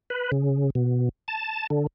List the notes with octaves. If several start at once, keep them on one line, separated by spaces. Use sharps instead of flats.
B4
C#3
B2
A5
D3